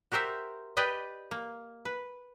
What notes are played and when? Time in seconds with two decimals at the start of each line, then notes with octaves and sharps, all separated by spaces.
0.12 F#4 G4 A#4 C5 E5
0.77 G4 B4 D5 D#5 G5
1.31 A#3
1.85 B4